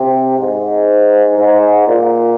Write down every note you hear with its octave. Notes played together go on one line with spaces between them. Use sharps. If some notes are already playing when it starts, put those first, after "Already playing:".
Already playing: C3
G#2
G#2
A#2